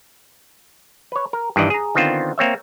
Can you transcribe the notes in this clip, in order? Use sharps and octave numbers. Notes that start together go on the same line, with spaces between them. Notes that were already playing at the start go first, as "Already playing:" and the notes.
B4 C#5
A#4
G2 D#3 E3 D5 D#5
G#4 A#5
D3 D#3 B3 C4 F4 C5
A#3 C4 C#5 E5